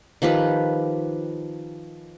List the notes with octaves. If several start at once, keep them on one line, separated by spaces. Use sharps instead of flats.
D#3 F3 G4 B4